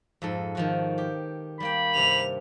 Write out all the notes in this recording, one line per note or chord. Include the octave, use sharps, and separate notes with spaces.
F2 G#2 A4
D#3 F3 F#4
G4
G3 A#3 G5 B5
G2 C3 G3 F7